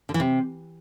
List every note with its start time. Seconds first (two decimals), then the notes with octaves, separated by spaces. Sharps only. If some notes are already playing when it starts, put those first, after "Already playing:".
0.09 D3
0.14 E3
0.20 C3